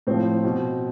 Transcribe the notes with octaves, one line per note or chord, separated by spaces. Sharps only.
A2 F3 C4
B2